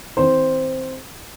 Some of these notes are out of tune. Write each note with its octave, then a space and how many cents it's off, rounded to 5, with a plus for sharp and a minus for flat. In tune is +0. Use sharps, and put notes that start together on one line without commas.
E3 -35 C4 +0 C5 +0